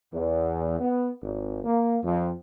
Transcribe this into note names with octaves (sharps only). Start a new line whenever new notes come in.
E2
B3
G#1
A#3
F2